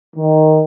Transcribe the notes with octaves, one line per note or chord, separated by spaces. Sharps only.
D#3